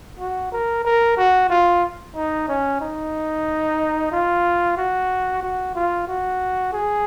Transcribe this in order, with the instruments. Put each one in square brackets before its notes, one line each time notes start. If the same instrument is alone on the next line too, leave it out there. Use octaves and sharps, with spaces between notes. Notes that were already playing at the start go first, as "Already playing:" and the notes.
[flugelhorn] F#4
A#4
A#4
F#4
F4
D#4
C#4
D#4
F4
F#4
F#4
F4
F#4
G#4